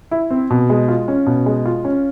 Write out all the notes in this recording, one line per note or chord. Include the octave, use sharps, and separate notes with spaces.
E4
C4
B2
G#3
F4
C#4
B2
G#3
F4
C#4